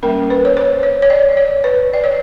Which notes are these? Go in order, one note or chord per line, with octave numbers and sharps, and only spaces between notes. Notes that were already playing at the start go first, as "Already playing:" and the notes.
G3 A#3 C#4 A#4
B4
C#5
C5
C#5
C#5
D5
C#5
B4
D5
C#5